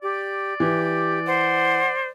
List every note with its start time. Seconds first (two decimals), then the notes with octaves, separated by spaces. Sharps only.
0.03 G4 D5
0.60 E3 G4
1.26 C5 F#5